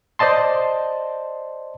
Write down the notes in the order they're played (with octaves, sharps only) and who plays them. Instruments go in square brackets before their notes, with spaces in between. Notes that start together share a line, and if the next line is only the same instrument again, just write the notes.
[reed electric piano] C5 D5 D#5 A5 C6